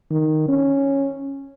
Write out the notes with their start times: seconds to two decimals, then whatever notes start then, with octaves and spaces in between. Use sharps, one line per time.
0.11 D#3
0.48 C#4